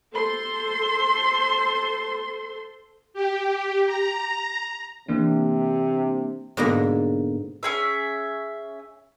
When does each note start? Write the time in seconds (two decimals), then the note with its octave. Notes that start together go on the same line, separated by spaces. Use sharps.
0.14 A4 C5 C6
3.14 G4
3.86 A#5
5.08 C3 E3 A#3 D4
6.57 G#2 B2 D3 A#3
7.63 C#4 G#4 E5